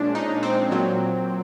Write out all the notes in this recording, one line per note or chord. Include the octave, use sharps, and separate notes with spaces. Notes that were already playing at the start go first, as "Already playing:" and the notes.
Already playing: A#2 F3 G#3 C#4 D4
D#4
C4
A#2 F#3